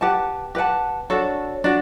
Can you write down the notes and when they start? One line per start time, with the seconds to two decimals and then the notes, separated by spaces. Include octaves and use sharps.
0.01 G4 B4 F#5 A5
0.55 G4 B4 F#5 A5
1.10 D4 F#4 A4 C#5
1.64 D4 F#4